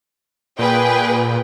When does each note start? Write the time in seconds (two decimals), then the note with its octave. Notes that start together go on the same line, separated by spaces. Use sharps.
0.59 A#2 G#4 B4 G5